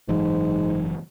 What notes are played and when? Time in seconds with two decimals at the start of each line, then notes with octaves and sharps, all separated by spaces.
0.09 F#1 G#2 E3 F#3